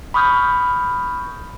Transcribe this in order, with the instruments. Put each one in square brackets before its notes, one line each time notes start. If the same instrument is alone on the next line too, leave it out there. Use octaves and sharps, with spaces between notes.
[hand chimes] B5 C#6 D#6 F6 G6